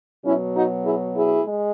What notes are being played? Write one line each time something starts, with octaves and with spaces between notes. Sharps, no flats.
B2 F#3 C#4 E4
D#4 F#4
E4 G#4
E4 G#4
G#3